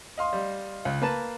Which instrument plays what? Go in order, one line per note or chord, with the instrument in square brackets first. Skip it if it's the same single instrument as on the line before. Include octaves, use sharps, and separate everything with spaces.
[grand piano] D#5 F5 C6
[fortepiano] G3
C#2
A#3 B4 A5